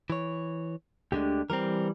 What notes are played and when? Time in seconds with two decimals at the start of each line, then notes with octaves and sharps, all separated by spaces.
0.10 E3 C#5
1.12 D2 D3 G#3 D4 G4
1.50 E3 G3 C4 A#4 A#5